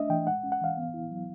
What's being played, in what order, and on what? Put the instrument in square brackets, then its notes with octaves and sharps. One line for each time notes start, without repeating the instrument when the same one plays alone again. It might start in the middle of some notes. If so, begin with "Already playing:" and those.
Already playing: [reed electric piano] A3 D4 D#5 E5
E3 G5
G#3 F#5
C#4
F#5
E3 F5
B3
E4
F#3